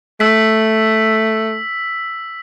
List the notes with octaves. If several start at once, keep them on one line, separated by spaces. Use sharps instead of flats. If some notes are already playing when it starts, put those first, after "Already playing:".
A3 E6 B6